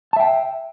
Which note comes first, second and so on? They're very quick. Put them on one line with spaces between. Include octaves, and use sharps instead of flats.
A5 E5 G5